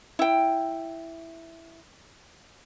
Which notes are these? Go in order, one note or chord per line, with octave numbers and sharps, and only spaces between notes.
E4 G5